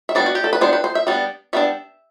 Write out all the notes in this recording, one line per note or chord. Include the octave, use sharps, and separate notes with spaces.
E5
G3 B3 D4 D5
F#4
G4
A4
B4
G3 B3 D4 C5
B4
C5
E5
G3 B3 D4
G3 B3 D4 E5